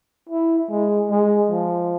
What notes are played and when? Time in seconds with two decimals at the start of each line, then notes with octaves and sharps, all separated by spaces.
0.29 E4
0.70 G#3
1.10 G#3
1.51 F3